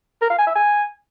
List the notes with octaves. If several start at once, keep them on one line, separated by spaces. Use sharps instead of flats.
A#4
F5
G#5
E5
G#5